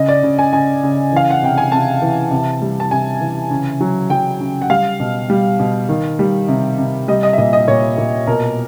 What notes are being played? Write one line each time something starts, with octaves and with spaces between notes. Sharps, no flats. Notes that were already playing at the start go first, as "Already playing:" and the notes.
Already playing: C#3 D#5
D5
C#3
G#5
C#3 G#5
C#3
E3 F5
F#5
C3 G5
G#5
C3 A5
E3
C3
G3
A5
C3 G#5
E3
C#3
F#3
F#3 G5
C#3
F#5
G3 F5
B2
G3
B2
D#3
G3
C3
C3
G3 D#5
D#5
E5
A#2 D#5
D#5
A#2 C#5
A#2
B2 A#4